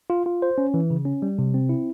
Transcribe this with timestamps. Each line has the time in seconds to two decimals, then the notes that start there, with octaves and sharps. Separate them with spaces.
0.10 F4
0.26 F4
0.42 C5
0.58 C#4
0.74 E3
0.90 C#3
1.05 C#4
1.22 G3
1.39 C3
1.54 C4
1.69 E4